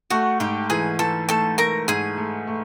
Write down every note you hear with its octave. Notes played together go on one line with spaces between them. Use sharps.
A3 F#4 F#5
G#2 G4 G5
E3 G#4 G#5
E3 A4 A5
A3 A4 A5
A3 A#4 A#5
G#2 G#4 G#5
A3
A3